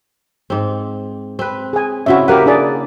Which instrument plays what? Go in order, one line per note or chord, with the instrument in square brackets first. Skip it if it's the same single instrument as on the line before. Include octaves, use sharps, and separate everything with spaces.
[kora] G#2 C4
C4 B4
[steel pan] G#4 G#5
[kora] C#3 C4 E4 [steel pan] F#4 E5
[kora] A#3 B4 [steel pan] G4 A#4 F#5
[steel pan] D4 G#4 D5